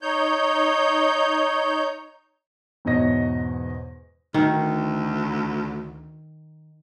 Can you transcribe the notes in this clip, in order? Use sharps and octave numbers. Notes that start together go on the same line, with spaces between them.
D#4 C#5 G6
E2 G#2 B2 C#5 D#5 A#6
D2 D#3